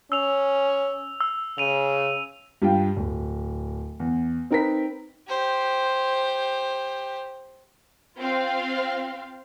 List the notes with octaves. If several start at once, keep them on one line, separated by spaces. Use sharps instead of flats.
C#4 E6 F7
E6
C#3 D#7 F7
G2 F4 G5
D1
E2
C4 D#4 A#4 B4 B6
G4 C5
C4 F4 F5